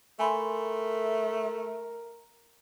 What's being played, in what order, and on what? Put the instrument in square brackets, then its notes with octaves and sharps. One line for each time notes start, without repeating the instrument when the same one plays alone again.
[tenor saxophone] A3 [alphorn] A#4 [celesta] G#5 B5 C6